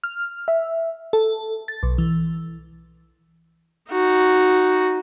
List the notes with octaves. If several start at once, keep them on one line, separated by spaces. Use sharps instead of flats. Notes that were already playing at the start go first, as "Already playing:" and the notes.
F6
E5
A4
A6
B1
E3
D#4 F#4